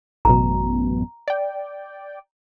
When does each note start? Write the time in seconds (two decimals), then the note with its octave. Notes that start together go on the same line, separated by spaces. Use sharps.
0.25 A1 F#2 B2 A#5
1.28 D5 G5